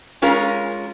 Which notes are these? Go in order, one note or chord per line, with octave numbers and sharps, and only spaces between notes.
G#3 C#4 F4 A#4